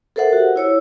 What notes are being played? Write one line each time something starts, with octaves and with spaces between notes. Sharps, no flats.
A4 A#4 C5 E5 F#5
F#4 G4
E4 C#5 E6